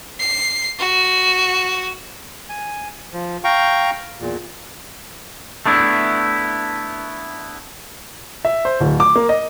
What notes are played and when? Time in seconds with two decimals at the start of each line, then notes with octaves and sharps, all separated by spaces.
0.19 C7
0.79 F#4
2.49 G#5
3.13 F3
3.44 F5 G5 A#5 C#6
4.20 E2 A#2
5.66 A3 B3 D4 E4
8.45 E5
8.65 C5
8.80 D1
9.00 D6
9.16 A#3
9.29 D#5